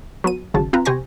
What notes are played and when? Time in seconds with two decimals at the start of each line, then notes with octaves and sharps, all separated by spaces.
0.24 F#3 B3 D#7
0.54 G#1 C#3 F#3 A5
0.73 C4 F4 B4 A#5
0.85 C3 G4 C5 G#5 C#6 A#6